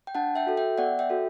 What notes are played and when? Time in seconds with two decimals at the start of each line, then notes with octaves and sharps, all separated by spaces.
0.07 G5
0.15 D4 F#5 A5
0.35 E5 G5
0.47 F#4 A4
0.57 E5 G5
0.78 B3 D5 F#5
0.99 E5 G5
1.10 F#4 A4